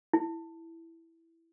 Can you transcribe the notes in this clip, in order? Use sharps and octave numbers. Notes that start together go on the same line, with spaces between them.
E4